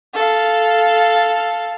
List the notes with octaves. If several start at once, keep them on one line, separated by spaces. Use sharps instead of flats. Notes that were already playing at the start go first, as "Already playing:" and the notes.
A4 F5